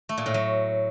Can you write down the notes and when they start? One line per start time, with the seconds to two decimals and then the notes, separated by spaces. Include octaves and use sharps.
0.09 A3
0.18 A#2
0.26 A2
0.34 F#3